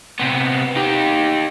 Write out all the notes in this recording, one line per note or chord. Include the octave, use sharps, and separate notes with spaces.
C3 B3
D#4 G4